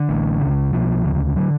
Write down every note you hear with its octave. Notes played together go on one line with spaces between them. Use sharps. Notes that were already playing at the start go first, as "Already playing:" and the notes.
Already playing: D3
A1 A2
C#2 C#3
B1 B2 F3
D2 C#3
D3 F#3